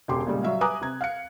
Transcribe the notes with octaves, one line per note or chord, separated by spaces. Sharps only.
E1 C#3 G4 C6 D6
A#2 C#3 G3 G#3
F#3 G3 E5 F5
B4 G#5 A#5 D6 D#6 F#6
C3 A#5 G#6
F5 F#6 C#7